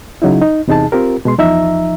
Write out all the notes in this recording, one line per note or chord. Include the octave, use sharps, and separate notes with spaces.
C#3 F#3 D#4 E4
D#4
E2 C3 D#4 G#4 A5
C4 F4 G4 A#4
B2 G#3 C6
E2 F3 D#4 E5 A#5